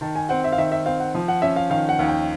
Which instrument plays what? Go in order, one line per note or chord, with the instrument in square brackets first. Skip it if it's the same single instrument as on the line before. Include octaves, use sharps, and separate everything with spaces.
[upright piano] D#3 [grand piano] A5
[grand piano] G#5
[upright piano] C4 [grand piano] F#5
[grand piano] E5
F5
[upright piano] D#3 [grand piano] E5
[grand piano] E5
[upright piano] C4 [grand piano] F5
[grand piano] F#5
[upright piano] F3
[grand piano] F#5
[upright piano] C#4 [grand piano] E5
[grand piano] F5
[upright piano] D#3 [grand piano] F5
[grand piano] F#5
[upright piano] D#2
[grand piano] G5